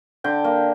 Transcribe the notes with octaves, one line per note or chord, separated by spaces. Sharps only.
D3 G5
A#3